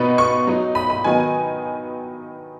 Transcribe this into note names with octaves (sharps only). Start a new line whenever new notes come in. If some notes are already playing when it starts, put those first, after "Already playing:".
Already playing: B2 B3 D#4 B5
C#6
F#3 D#4
B5
B5
D#3 F#3 B3 D#4 G#5